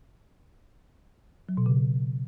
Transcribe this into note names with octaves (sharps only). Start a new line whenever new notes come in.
F#3
B2
C#3